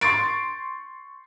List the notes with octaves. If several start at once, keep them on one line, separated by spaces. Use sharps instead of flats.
C6 C#6 A6 D7